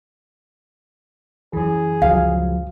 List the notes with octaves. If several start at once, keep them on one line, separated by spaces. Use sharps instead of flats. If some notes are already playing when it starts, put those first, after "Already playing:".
F#2 E3 G#4
C#2 F3 F#3 F5